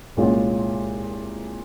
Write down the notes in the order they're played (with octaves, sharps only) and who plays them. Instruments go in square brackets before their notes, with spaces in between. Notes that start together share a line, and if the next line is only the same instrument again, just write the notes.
[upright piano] C2 A#2 G#3 C#4 F4